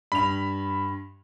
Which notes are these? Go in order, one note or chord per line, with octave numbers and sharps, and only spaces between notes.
G2 B5 F7